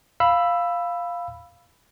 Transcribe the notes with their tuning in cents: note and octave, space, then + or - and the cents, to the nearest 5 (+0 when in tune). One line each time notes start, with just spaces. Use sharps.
F5 +0 B5 +0 E6 +10